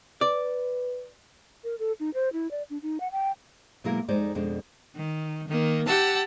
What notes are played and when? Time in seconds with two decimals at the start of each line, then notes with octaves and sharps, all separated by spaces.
0.21 B4 D5
1.64 A#4
1.79 A4
2.00 D#4
2.14 C5
2.33 E4
2.51 D5
2.70 D4
2.82 D#4
3.00 F#5
3.12 G5
3.84 B2 F#3 G#3 A#3 E4 A#4
4.08 F2 G#3 D#4 C5 D5
4.35 F2 B2 G#3 D4
4.95 D#3
5.48 D#3 A#3
5.86 G4 F#5 A5 E6